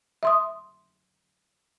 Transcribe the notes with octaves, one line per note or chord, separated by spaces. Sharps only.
E5 C6 D#6